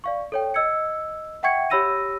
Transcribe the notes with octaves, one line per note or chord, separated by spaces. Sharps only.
D5 F5 C#6
A4 C#5 G5
D#5 E6 G#6 C#7
E5 F#5 G5 C#6 G#6 C#7
G4 C#5 B5 E6 A#6 D#7